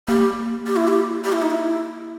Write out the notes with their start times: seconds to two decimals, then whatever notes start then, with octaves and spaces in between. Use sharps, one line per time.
0.08 A#3 G4
0.67 G4
0.76 E4
0.88 G4
1.24 G4
1.32 E4
1.42 D#4
1.51 E4